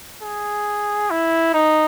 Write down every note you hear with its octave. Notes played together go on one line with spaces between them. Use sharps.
G#4
E4
D#4